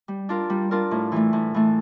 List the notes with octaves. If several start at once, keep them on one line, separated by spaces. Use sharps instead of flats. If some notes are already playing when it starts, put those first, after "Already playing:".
G3
D4 F4 A#4
G3
D4 F4 A#4
A2
E3 A3
A2
E3 A3